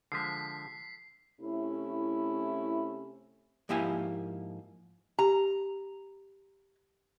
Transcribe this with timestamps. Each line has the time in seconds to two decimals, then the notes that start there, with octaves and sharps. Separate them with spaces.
0.12 D3 F3 G#3 B6 C7
1.41 C3 A3 C#4 E4
3.69 G#2 F3 A#3 E4 G4 G#5
5.19 G4 A#5